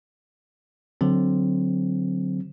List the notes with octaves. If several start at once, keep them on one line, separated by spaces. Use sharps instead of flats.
D3 F#3 C4